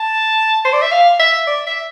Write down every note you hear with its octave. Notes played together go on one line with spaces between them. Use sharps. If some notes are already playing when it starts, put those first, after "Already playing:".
Already playing: A5
C5
D5
E5
F5
E5
D5
E5